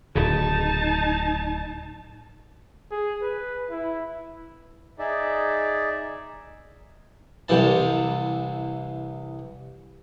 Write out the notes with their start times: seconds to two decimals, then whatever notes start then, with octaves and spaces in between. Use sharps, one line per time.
0.15 D1 C#3 D#4 A5
2.91 G#4
3.22 B4
3.70 E4
4.99 D#4 G#4 D5 E5
7.49 C2 C3 E3 A5